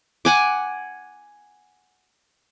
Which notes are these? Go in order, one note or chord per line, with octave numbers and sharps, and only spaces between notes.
F#5 G#5 D6